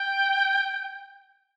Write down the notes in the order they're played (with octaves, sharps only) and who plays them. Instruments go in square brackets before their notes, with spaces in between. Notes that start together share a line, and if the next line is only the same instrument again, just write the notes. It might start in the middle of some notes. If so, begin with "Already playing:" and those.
Already playing: [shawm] G5